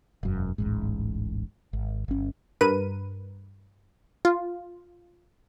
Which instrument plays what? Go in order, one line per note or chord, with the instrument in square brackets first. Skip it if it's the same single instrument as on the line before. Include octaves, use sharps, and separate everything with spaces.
[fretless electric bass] E1 F#2
D1 A1 G#2
G#1
G1 C#4
[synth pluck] G2 A#4 B4 D#7
F4